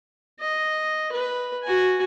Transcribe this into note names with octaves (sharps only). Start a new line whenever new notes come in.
D#5
B4
F#4 G#5